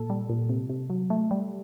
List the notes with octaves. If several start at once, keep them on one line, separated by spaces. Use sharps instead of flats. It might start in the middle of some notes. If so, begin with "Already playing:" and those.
Already playing: A#2 A4
G3
A#2
C3
C3
F#3
A3
G3